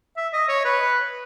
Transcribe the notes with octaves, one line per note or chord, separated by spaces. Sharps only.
E5
D#5
C#5
B4